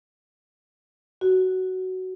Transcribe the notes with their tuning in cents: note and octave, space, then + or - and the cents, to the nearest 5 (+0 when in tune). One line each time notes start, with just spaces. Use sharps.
F#4 +10